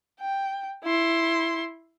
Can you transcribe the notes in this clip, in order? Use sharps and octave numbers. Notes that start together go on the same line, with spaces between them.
G5
E4 C6